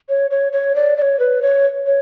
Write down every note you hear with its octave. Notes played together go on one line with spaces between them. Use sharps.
C#5
C#5
C#5
D5
D5
C#5
B4
C#5
C#5